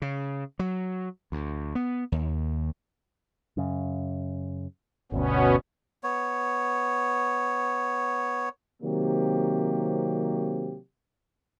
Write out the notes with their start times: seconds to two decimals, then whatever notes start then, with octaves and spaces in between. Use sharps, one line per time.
0.02 C#3
0.59 F#3
1.32 D2
1.75 B3
2.12 D#2
3.57 F#2 C#3
5.12 G1 D2 B2 B3 C#4
6.03 B3 C#5
8.83 C3 D#3 F#3 A#3 C4 G4